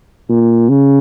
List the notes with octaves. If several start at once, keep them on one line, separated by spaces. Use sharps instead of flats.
A#2
C#3